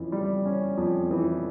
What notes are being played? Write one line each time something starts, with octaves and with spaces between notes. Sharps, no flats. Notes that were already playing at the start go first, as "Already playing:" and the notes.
Already playing: F2 E3 C#4
G3
C#4
F2
E3